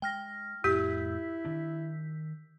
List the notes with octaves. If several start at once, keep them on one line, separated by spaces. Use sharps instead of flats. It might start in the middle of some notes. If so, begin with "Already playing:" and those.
G#3 G5 F6 A#6
F2 A2 E4 G4 E6 G6 B6
D#3 D4